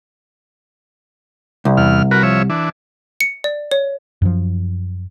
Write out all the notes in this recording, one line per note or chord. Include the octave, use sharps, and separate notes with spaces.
C2
E2 F6
F#4 A#4 B4
F3 C#5 E5
E3 D4
C#7
D5
C#5
F#2 F3